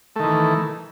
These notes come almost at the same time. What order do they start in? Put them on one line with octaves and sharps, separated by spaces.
A3 D#3 E3